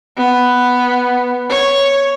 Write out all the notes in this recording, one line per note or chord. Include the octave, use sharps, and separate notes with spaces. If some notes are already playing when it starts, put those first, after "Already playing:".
B3
C#5